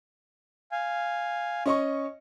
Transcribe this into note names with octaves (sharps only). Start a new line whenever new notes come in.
F5 G#5
C#4 D#5 C#6